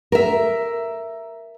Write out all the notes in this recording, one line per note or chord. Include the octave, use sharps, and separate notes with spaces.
A#4 E5